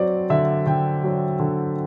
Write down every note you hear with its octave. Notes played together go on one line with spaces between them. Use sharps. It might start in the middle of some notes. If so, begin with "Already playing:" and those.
Already playing: F#3 C4 D5
D3 E5
D3 G5
F#3
D3